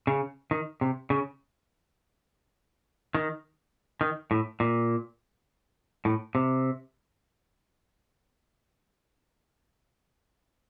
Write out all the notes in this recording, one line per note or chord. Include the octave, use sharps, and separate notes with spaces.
C#3
D#3
C3
C#3
D#3
D#3
A2
A#2
A2
C3